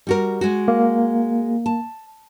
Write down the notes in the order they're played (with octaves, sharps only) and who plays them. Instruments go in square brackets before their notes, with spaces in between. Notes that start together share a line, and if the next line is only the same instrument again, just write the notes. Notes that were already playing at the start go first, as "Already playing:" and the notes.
[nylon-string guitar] G3 F#4 A#4
G#3 F#4
[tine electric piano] A#3
[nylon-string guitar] A5